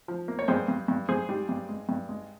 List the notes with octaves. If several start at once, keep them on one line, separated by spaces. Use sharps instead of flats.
F3
A#3
C#5
G2 G#4 C5
G2
G2
G2 G#4 C5
G3
G2
G#3
G2
G#3